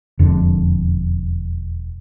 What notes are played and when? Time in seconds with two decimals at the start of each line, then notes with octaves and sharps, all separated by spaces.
0.19 E1 F2 D3